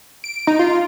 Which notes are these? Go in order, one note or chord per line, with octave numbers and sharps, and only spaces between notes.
D7
D#4
F4